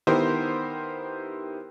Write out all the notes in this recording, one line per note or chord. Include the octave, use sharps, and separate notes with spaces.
D#3 B3 E4 G4 A#4 C5